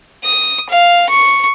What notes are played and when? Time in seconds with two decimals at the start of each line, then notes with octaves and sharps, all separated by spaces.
0.24 D#6
0.69 F5
1.10 C#6